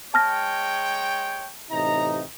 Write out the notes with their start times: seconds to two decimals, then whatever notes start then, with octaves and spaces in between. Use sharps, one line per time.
0.14 G#3 C#5 G5 A5 F6 A#6
1.71 A1 C3 D#4 A#5